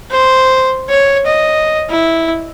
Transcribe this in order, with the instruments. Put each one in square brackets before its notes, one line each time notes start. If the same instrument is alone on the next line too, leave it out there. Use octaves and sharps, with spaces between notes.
[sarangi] C5
C#5
D#5
E4